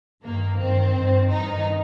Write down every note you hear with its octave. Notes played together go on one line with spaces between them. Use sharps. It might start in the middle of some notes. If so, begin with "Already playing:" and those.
G2 D#3 A#3
G2 D#3 C4
G2 D#3
G2 D#3 D#4